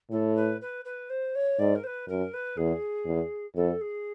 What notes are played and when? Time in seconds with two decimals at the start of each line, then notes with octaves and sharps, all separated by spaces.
0.11 A2 A4
0.35 B4
0.61 B4
0.85 B4
1.09 C5
1.35 C#5
1.59 G#2 D5
1.75 A#4
1.83 C5
1.86 B4
2.08 F#2 A#4
2.33 B4
2.57 E2 G#4
3.06 E2
3.56 F2 A4
3.81 G#4